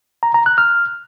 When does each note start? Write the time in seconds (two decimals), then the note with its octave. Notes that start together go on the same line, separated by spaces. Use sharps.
0.23 A#5
0.34 A#5
0.46 F#6
0.58 F6